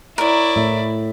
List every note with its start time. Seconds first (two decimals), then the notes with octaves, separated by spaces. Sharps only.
0.18 E4 A#4 C#5 D5
0.56 A2 E5